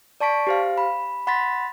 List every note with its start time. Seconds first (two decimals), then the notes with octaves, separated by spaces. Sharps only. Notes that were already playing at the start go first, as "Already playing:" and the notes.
0.20 D5 A5 C#6 B6 D7
0.47 G4 C5 F5
0.78 B5
1.27 F#5 B5 C6 A6 B6